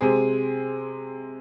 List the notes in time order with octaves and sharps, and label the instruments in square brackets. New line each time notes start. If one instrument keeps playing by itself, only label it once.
[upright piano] C3 G#3 C4 G#4